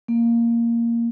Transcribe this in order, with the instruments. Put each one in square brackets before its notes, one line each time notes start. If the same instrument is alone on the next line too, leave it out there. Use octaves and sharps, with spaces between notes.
[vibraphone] A#3